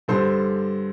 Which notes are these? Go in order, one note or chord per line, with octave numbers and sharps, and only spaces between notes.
G2 D3 G3 A4 C5